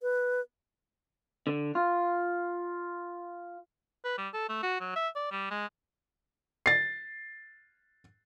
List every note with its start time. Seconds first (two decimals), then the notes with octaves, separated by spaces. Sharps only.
0.02 B4
1.47 D3
1.75 F4
4.05 B4
4.18 G3
4.34 A4
4.49 A3
4.63 F#4
4.81 F#3
4.96 E5
5.16 D5
5.31 G3
5.51 G#3
6.66 A6 C7